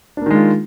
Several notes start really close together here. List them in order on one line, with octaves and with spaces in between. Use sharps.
D4 A#3 D#3 G#3 F4